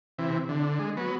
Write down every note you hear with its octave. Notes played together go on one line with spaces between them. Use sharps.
C3 E3
D3
G#3
F#3 B3